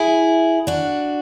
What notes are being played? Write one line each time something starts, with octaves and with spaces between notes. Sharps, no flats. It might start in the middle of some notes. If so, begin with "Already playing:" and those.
Already playing: E4 G#4
D4 F#4